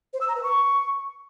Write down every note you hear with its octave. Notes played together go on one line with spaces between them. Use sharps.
C5
E6
A#5
B4
C#6